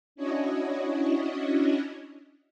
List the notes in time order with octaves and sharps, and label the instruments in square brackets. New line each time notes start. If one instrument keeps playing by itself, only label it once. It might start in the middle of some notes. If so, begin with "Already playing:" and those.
[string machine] C#4 D4 E4 F#4 C#5 D#5